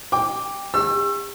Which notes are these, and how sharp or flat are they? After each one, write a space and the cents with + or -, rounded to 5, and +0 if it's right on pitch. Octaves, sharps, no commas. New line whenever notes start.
G5 +20 D6 -5
G4 +45 C#6 -35 E6 +25